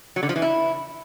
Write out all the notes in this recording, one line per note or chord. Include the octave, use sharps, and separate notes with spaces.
F#3
D3
F3
E3
E4